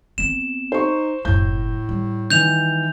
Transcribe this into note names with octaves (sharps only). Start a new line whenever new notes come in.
B3 C4 E7
D#4 C5 C#6
F#1 F#2 A2 G6
G3
D#3 E3 G6 F7